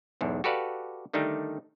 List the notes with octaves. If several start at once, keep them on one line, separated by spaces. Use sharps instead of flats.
B1 E2 G#2
F#4 G4 A4 B4 D5 F5
D3 D#3 G3 A3 D#4